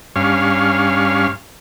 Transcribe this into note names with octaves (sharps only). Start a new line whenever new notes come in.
G2 C#4 F5